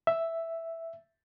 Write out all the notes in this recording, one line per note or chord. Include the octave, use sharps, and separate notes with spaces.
E5